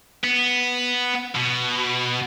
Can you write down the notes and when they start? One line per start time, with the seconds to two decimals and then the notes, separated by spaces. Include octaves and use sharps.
0.24 B3
1.36 B2